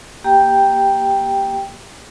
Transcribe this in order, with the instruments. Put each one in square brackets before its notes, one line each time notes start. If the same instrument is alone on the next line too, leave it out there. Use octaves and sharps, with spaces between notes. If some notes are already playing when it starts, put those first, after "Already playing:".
[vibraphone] A#3 G4 G5